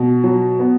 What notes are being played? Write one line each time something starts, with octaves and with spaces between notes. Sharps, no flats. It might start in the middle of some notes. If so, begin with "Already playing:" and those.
Already playing: B2
F#3
B3